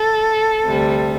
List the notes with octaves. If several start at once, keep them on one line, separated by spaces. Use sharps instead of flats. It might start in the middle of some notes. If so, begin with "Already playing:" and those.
Already playing: A4
D2 C3 G3